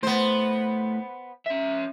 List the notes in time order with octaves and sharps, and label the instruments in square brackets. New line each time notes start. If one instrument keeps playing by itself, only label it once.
[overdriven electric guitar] A2 [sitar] B3 C5
[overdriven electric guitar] C#4 E5